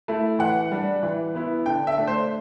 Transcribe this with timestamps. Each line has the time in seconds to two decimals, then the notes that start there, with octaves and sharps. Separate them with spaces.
0.08 A3 E4
0.39 E3 F#5
0.72 G3 D4
1.03 E3
1.35 B3 E4
1.66 D3 G5
1.87 E5
1.98 A3 D4
2.07 C5